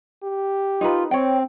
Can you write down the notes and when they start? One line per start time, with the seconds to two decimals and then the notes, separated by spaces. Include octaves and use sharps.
0.23 G4
0.81 D#4 F4 A#4 B4
1.11 C4 C#5 G5